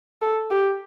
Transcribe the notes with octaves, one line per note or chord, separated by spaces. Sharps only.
A4
G4